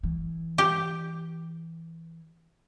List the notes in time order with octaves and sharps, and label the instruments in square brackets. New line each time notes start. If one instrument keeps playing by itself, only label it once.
[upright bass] E3
[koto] G4